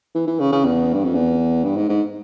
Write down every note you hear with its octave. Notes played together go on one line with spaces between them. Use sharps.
E3
E3
C#3
C#3
E2
G2
F2
E2
G2
G#2
G#2